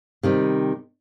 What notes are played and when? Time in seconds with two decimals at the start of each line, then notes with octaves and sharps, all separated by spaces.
0.23 C3 D#3 G3